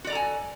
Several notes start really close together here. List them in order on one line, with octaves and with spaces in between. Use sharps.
F#4 D5 A#5 A4 G#5